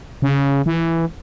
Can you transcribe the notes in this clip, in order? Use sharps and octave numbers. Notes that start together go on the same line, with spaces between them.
C#3
E3